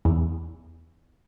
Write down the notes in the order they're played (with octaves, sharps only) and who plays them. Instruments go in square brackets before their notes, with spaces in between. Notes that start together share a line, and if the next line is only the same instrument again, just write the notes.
[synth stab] E2